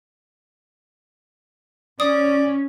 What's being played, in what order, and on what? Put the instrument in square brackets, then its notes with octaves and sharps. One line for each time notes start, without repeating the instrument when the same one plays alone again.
[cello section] C#4 [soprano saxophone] D5 [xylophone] D#6